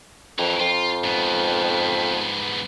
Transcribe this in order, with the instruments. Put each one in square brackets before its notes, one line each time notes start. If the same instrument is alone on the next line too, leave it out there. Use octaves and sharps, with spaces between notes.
[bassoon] F2 [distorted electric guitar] E3 A#4
[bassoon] F2 [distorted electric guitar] F4
[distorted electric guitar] G#2 B3